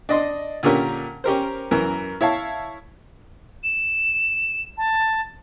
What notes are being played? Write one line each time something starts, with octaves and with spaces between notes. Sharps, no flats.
D4 D#5 C6
A#2 D3 C#4 G4 A#4
C#4 G4 A#4 C5
F#2 E3 A#4
E4 C#5 F5 A5
E7
A5